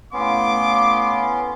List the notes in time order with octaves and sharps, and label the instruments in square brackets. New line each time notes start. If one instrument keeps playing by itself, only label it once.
[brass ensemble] A2 F5 [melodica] B3 C#4 [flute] C6 [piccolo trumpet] D6